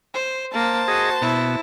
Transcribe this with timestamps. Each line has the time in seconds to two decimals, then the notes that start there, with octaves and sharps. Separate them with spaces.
0.14 C5
0.54 A#3 C5 A5
0.88 F#4 G#4 D#5
1.22 B2 E4